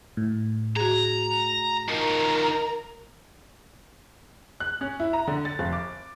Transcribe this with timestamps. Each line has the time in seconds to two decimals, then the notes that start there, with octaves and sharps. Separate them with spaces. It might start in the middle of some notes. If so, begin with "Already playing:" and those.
0.17 A2
0.76 F#4 G#4 A#5
1.88 D#3 F3 A#4 A#5
4.60 F#6
4.81 C#4
5.00 E4
5.13 A#5
5.27 D3
5.45 A6
5.59 F1
5.73 D6